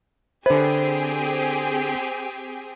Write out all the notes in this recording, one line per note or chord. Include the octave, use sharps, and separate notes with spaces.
D3 C4 G4 G#4 B4 C5